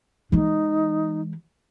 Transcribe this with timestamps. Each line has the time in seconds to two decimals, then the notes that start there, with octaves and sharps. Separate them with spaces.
0.32 E3 G#3 D#4